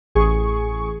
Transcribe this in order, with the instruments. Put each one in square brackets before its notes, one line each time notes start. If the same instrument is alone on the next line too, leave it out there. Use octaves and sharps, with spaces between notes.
[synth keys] A1 G#4 C#6